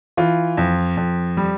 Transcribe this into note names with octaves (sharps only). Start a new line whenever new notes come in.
E3 F4
F2
F2
G3